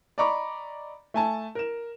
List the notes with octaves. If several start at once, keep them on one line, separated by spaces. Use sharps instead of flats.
D5 D#5 A#5 B5 C#6 D6
A3 G#5 A5
A#4 E7